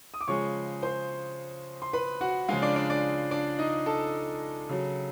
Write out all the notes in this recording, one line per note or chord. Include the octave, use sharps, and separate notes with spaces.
D#6
D6
C#3 F3 G#3 C#5 C#6
C5 C6
C6
B4 B5
F#4 F#5
C#3 F3 G#3 F4 F5
D4 D5
D4 D5
D4 D5
D4 D5
D#4 D#5
A4 A5
C#3 F#3